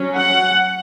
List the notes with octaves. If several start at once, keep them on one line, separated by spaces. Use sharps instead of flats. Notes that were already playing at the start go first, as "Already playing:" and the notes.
Already playing: F#3 C#4
F#5